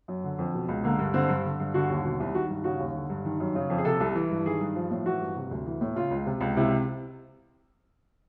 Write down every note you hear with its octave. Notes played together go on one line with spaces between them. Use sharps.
F#2
D3
F2
B2
C#2
D3 A#3
G2
D3 C4
G2
D3
G2
D3 F#4
D#2
B2
C2
D#3 F#4
G2
C#3 F#4
D#2
D3
G2
D#3
F#2
C#3
F2
G#4
C3 A4
C2
E3
G2
D#3 G#4
G2
F3
A2
E3 F#4
G2
C3
D2
E3
A2
C#3 F4
C#2
C3
C#2
C3 E4